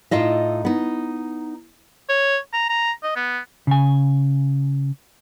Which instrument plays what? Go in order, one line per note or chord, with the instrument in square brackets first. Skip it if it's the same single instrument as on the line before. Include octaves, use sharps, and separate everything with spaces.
[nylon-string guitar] A2 D#4 F4 D#5 E5
B3 D#4
[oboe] C#5
A#5
A#5
D#5
B3
[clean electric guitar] C#3 G#5